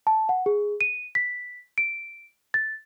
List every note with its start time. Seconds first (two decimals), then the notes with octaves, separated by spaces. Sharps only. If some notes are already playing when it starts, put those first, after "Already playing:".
0.07 A5
0.29 F#5
0.46 G#4
0.81 D#7
1.15 B6
1.78 D7
2.54 A6